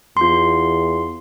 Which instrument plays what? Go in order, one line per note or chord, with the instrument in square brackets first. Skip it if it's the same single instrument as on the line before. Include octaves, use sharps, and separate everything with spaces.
[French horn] E2 [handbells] F4 C6